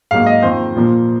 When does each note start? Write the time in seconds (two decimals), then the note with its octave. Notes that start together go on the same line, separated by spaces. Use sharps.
0.11 G#2 F#3 A#3 F5
0.26 D#5
0.42 F2 D#3 A#3 C5
0.76 A#2 F3 A#3